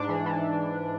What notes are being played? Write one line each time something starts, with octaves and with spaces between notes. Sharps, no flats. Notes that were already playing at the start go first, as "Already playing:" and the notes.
Already playing: G#2 D4
E3
E3